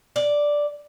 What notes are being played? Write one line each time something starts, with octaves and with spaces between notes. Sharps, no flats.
D5